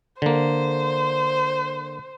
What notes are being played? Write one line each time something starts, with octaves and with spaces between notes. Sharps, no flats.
D3 A#3 C5